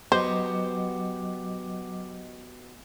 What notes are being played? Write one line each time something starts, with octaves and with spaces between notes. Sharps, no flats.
F#3 B3 F#4 G4 C5 D#5 D6